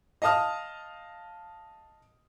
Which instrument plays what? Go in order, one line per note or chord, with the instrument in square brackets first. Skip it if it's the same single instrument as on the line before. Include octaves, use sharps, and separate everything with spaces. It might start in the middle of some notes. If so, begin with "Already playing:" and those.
[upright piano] D#5 F5 A5 D#6 F6